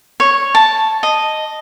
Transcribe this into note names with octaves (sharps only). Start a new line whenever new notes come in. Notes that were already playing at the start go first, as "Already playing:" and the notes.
C#5
A5
D#5